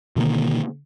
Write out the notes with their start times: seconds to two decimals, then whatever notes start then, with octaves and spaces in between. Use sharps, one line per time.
0.16 B2 D3 D#3 A#3